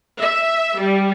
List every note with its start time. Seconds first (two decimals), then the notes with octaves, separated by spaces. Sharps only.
0.17 E5
0.78 G3